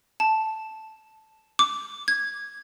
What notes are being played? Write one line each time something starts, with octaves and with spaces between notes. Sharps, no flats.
A5
D6
G#6